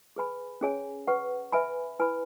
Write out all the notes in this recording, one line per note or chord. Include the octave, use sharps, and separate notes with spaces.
G#4 B4 G#5 B5
C#4 G#4 C#5 G#5
B4 F#5 C#6
B4 E5 G#5 B5
E4 B4 G#5 B5